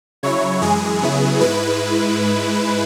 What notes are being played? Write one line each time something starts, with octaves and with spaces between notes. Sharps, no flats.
C#3 F#3 E4 C#5
F#2 E3 G#3 G#4
C#3 F#3 B3 E4
G#2 G#3 E4 B4